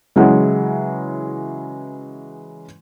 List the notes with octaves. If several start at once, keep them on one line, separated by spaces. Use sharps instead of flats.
C#3 E3 F#3 G#3